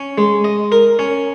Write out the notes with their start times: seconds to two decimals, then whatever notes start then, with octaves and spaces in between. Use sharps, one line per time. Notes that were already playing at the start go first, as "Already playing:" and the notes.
Already playing: C#4
0.18 G#3
0.44 D#5
0.72 A#4
0.99 C#4